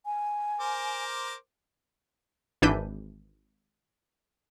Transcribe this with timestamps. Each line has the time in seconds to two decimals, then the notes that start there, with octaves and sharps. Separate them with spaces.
0.05 G#5
0.60 A#4 C5 D6
2.62 G#1 E3 D4 G6 B6 D#7